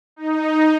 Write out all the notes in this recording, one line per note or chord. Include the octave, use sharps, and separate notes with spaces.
D#4